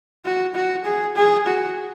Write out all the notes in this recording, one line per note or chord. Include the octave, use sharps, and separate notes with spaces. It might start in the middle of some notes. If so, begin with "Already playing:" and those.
F#4
F#4
G#4
G#4
F#4